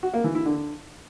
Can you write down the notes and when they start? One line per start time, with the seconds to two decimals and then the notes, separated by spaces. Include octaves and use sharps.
0.03 F#4
0.14 A#3
0.24 E3
0.35 E4
0.46 D3